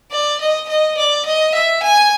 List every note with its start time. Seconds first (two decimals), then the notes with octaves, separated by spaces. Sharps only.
0.12 D5
0.41 D#5
0.69 D#5
0.97 D5
1.26 D#5
1.54 E5
1.83 G#5